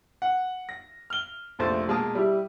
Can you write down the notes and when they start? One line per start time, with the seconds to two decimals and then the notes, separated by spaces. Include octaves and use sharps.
0.22 F#5
0.69 A#6
1.10 F6 G7
1.59 F1 A#1 A3 C5 A6
1.88 B2 G#3 A#3 A5 D#6
2.15 G3 E4 G4